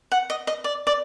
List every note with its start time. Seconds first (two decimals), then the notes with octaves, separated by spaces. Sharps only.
0.12 F#5
0.30 D#5
0.47 D#5
0.64 D5
0.87 D5